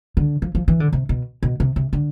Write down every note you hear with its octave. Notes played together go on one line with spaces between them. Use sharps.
D3
F3
F3
E3
D3
C3
B2
B2
C3
C3
D3